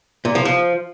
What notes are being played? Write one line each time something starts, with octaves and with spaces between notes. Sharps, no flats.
A#2
F3
F3